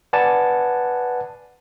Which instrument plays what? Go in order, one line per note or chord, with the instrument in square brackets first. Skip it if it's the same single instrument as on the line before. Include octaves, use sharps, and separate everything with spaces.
[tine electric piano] B4 D5 F#5 G#5 A5